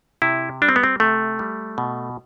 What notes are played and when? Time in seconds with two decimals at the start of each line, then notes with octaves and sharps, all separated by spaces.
0.22 C3 E4
0.62 G3 D4
0.69 C4
0.76 B3
0.84 C4
1.00 C3 A3
1.39 G3
1.78 B2